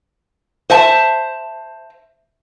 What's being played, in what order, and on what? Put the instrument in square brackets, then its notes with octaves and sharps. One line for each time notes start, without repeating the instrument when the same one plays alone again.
[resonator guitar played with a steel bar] C5 E5 A5